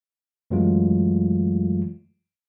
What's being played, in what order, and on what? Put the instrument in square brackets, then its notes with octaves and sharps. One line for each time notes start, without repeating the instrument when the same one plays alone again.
[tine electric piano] F#2 E3 F#3 G#3 A3 F4